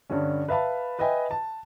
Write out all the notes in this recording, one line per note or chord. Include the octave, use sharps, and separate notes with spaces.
G2 D3 G3 C#4
B4 E5 F5 A5 B5
B4 D#5 E5 G5 G#5 B5
A5